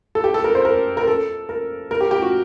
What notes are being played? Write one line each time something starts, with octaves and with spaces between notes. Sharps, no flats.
A4
G4
A4
A#4
C5
A#4
A#4
A4
A#4
A#4
G4
G4
F#4